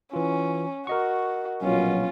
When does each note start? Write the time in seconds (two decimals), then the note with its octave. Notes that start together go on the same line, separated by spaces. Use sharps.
0.13 E3 C#4 F4
0.87 F#4 A#4 D#5 C#6
1.62 A#1 B2 F#3 C#4 F4